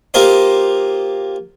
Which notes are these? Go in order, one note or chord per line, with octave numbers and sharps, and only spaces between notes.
A#3 F4 G4 A#4 C5 D#5